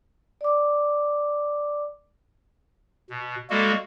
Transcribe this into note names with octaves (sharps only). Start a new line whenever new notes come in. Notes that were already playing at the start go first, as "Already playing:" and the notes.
D5 D6
B2
G3 G#3 A#3 F#4 A4